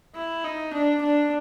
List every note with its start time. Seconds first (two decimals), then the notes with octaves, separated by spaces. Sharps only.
0.15 E4
0.44 D#4
0.73 D4
1.02 D4